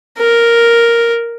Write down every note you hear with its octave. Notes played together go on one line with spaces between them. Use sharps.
A#4